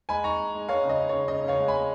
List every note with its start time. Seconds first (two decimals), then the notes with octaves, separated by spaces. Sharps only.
0.09 G#3 G#5 B5
0.24 D#4 A#5 C#6
0.40 D#4
0.54 G#3
0.69 G#3 C#5 F5
0.84 C#3
0.89 D#5
0.99 D#4
1.09 C#3 C#5
1.28 C#3 D#5
1.44 C#3 C#5 F5
1.59 G#3
1.68 G#5 B5
1.74 G#3